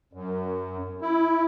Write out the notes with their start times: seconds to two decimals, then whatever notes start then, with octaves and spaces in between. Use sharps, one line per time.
0.13 F#2
1.01 E4